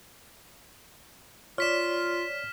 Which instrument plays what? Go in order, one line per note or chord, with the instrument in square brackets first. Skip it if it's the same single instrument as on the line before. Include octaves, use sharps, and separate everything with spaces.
[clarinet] F4 [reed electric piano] C#5 D5 [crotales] F6 B6 E7